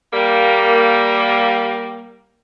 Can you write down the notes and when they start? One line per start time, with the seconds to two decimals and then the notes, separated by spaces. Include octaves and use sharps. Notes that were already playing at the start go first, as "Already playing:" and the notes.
0.13 G3 A#3